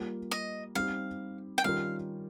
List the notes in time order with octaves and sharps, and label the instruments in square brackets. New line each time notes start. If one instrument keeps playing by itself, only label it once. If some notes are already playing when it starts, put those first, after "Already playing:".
Already playing: [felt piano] G3 A#3 F4
[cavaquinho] D#5
[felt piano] G3 C4 D#4 G4 [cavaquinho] F5
[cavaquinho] G5
[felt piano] D#3 G3 C#4 F4 A#4 [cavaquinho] F5